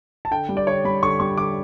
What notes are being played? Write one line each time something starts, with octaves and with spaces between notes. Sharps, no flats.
A5
D3 G5
G3
D5
D3 C#5
G3 B5
D3 C#6
G3 C#6
D3 D6